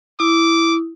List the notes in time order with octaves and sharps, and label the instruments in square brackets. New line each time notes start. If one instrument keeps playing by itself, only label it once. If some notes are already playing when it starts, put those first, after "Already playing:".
[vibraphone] E4 D#6 [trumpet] D6